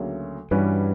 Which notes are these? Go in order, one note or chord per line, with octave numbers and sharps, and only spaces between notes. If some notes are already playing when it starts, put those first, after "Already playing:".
Already playing: D2 C#3 F#3 A#3
G2 E3 G3 C#4 F#4 B4